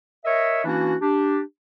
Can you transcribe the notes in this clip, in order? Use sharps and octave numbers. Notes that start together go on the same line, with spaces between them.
A#4 C#5 D#5 E5
E3 A#3 C#4 D4 E4 F#4
D4 G4